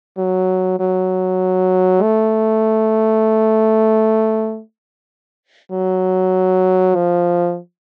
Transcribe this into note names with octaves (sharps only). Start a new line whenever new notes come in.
F#3
F#3
A3
F#3
F3